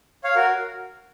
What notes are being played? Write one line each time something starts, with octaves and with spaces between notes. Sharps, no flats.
C#5 F5
F#4 A#4